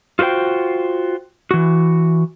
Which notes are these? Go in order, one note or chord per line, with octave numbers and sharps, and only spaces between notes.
F4 F#4 A4 C5 G5
E3 F#4